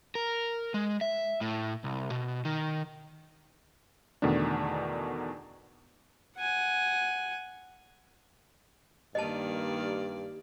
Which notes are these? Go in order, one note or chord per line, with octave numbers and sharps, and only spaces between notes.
A#4
G#3
E5
A2
C2
B2
D#3
E2 B2 D3 D#3 A3 D4
F#5 G#5
G2 D#3 A#3 G4 D5 D#5 A5